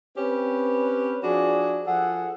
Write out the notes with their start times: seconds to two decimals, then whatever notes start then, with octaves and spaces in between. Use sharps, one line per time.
0.17 C4 C#4 G4 B4
1.23 F3 D4 F#4 G#4 D5
1.86 F3 G#4 A4 F#5